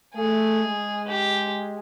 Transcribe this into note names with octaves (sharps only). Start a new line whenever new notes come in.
A3 G#4
G#3
G4